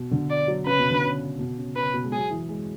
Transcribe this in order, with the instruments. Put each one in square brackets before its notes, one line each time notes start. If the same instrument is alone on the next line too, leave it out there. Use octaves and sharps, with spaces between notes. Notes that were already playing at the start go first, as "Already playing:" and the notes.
Already playing: [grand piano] B2
D3
[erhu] D5
[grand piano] F#3
[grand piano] C#3 [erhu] B4
[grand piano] B2
D3
C#3
B2
C#3
[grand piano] C#3 [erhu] B4
[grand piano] B2
G#3
[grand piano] F#3 [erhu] G#4
[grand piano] E3
G#3